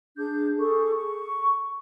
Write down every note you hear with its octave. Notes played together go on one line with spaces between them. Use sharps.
D4 G#4 D6 G6
G#4 A4 C#6 D6
C#6